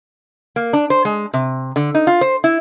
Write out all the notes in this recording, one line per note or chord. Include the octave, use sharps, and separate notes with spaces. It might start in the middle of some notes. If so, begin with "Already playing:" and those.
A#3
D4
C5
G#3
C3
D3
D#4
F4
C5
E4